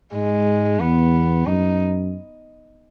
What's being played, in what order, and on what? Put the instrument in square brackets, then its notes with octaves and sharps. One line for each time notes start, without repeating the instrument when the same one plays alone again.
[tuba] G#2 [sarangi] G#3
[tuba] E2 [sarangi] B3
[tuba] F#2 [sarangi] D#4